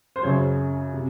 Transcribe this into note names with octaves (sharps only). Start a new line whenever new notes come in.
C5
F#2 C#3 F#3 C#5
C3